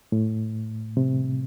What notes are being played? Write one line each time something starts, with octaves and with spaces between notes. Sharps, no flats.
A2
C3